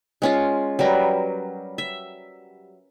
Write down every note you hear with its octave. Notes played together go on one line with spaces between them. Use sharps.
G#3 C#4 F4
F#3 G3 A#4 B4
E5